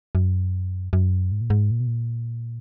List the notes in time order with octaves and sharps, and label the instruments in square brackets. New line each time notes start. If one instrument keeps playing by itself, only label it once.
[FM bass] F#2
F#2
G#2
A#2
G#2
A#2
B2
A#2